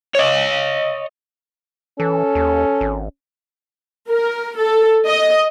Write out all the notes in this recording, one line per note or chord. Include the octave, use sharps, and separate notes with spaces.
C#5 D#5
E3 C#4 A4
D#2
G#1
A#4
A4
D#5